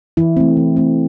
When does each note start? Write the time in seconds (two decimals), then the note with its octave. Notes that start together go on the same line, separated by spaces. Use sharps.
0.17 E3 E4
0.37 A3 C4
0.57 E3
0.76 A3 C4